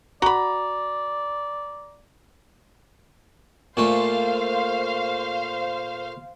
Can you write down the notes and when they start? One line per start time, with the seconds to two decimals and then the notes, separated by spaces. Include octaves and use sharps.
0.22 F#4 D5 A#5 B5
3.77 A#2 A3 C5 F5